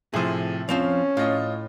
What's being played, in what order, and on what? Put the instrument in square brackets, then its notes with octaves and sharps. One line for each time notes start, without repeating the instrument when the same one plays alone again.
[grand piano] A2 C3 F3 [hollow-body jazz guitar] G#4 C5
[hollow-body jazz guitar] F3 C4 F4 [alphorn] C#4 [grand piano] F7
[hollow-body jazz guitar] A2 [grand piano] F4 D#5